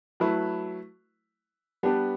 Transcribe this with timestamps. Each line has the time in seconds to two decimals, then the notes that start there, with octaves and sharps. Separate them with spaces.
0.20 F#3 A3 E4 B4
1.83 G3 B3 D4 G4 B4